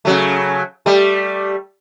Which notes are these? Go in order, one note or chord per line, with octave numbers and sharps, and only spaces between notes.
C#3 F#3 A3
G3 A3